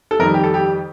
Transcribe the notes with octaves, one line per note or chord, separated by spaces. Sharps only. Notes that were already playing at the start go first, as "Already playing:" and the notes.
A4
F2 D#3 G3 A#4
G4
A4
G4